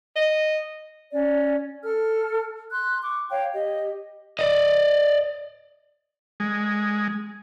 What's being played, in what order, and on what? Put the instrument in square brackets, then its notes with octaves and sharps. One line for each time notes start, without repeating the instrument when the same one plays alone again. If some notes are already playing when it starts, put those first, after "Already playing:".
[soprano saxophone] D#5
[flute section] C#4 D5
A4 F6
C6 F#6
C#6 D6
C#5 F5 G5
G4 D#5
[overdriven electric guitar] D5 D#5
[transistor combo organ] G#3